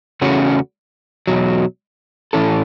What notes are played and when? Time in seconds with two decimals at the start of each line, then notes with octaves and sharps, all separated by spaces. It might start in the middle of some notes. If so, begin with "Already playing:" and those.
0.21 E2 C#3 A3 C#4 F#4
1.27 E2 B2 F#3
2.33 A2 E3 C#4 A4